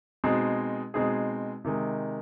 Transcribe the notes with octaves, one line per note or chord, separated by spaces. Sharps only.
B2 G#3 C4 D#4 G#4
B2 G#3 C4 D#4 G#4
C3 D#3 G#3